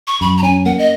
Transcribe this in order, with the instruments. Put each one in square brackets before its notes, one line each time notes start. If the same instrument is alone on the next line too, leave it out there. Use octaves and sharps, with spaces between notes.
[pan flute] C#6
[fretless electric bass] F#2 [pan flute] B5
[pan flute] A#5
[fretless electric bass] C#4 [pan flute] G#5
[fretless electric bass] A#3 [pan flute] F#5
[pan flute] D#5